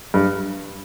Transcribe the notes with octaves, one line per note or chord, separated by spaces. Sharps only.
G2